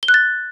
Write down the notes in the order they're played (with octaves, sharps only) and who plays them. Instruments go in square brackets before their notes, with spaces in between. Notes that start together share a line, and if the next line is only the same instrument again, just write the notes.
[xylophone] G7
F#6
A6